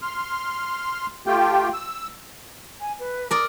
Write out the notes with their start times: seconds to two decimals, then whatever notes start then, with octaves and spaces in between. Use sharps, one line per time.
0.02 C6 F6
1.27 A3 F4 G4 G5
1.73 E6
2.79 G#5
2.99 B4
3.31 A#4 D5 D#6